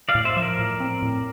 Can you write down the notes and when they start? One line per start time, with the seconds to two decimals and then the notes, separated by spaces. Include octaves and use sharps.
0.09 D5 F5
0.15 A2
0.25 C5 E5
0.36 F3 E5
0.42 A#4 D5
0.59 A2
0.80 C4
1.02 A2